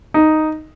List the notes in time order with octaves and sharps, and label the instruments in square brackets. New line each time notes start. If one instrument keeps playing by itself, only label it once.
[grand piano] D#4